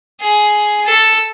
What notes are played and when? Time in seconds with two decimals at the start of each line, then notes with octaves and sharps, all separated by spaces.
0.21 G#4
0.86 A4